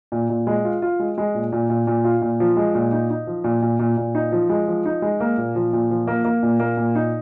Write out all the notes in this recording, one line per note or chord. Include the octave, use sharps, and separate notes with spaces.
A#2
A#2
G#3
F4
F4
G#3
G#3
A#2
A#2
A#2
A#2
F4
A#2
F3
G#3
A#2
D#4
D#4
F3
A#2
A#2
A#2
A#2
D#4
F3
G#3
F3
D#4
G#3
A#3
A#2
F3
A#2
F3
A#3
A#3
A#2
A#3
A#2
D#4